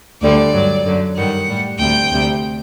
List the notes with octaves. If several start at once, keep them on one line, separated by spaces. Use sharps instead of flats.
D2 D3 G3 D5
G2 F#3
F#2 D3 F#3
G2 D#3 G3 F#5
A2 G3
D2 C3 G3 G5
D2 C3 G3